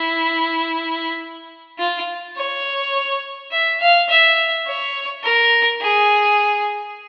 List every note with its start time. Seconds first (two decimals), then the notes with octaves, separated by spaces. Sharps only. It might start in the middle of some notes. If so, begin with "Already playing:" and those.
Already playing: E4
1.79 F4
2.37 C#5
3.51 E5
3.80 F5
4.10 E5
4.67 C#5
5.23 A#4
5.81 G#4